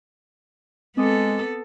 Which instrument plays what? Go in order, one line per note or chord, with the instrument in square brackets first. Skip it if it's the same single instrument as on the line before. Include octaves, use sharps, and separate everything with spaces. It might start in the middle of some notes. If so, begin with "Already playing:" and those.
[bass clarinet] G#3 [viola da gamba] B3 A4 [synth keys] C4 D6 D#6